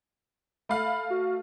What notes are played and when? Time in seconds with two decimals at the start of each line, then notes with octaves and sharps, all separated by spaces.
0.69 A3 F5 B5
1.10 F#4